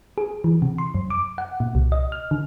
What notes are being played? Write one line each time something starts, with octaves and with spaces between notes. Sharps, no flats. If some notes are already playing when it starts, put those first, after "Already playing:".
G#4
E3
C3
C6
F#2
D6
F#5
A#2
C2
D#5
F6
D3